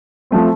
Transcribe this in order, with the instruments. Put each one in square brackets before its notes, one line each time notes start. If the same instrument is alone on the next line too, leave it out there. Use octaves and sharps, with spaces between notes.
[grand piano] F3 A3 C4